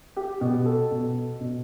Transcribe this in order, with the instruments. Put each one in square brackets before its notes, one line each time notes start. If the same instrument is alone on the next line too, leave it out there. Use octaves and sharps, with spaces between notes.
[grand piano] G4
B2 G4
A4
B2
B2